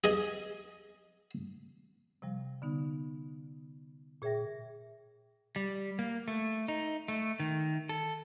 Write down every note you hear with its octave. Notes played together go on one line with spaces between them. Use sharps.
G#4 D#5
C3 F3 G3
D3 B3 D#4
A#2 G#4 C#5 E5 G5 A#6
G3
A#3
A3
D#4
A3
D#3
A4